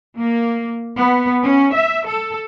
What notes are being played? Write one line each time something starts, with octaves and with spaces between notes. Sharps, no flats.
A#3
B3
C#4
E5
A4